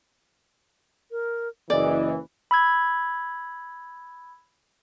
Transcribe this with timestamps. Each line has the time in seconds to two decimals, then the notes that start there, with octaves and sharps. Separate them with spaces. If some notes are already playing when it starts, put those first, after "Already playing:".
1.11 A#4
1.70 F#1 E3 D5 D#5
2.51 B5 E6 G#6